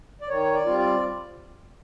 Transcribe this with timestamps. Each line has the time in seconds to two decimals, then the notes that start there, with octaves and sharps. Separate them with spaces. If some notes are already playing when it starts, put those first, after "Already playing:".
0.21 D5
0.29 D#3 C#5
0.54 D5
0.66 G3 C4 F4
0.78 D5